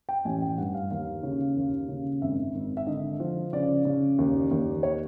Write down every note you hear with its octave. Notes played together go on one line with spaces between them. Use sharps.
G5
A1 G#5
G5
G2 F#5
F5
D#2 F5
C#3
D#2
C#3
G#1 E5
G#1
E5
D3 D#5
F3
C#3 D5
C#3
D#2
D#2
C#5